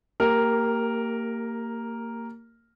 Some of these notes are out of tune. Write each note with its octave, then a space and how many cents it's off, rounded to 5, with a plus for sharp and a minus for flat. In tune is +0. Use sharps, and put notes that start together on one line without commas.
A#3 -25 G4 +0 A#4 +0